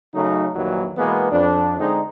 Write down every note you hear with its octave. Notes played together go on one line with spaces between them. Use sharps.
C#3 F#3 A3 D#4
A#1 D#2 A#2 D#3 E3 F#3
B2 E3 G#3 A#3 B3
F2 D4
D3 G#3 C4 D#4